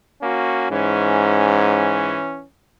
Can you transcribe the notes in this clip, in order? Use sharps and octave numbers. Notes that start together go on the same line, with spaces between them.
A#3 C#4 F#4
G#2 E3 C#4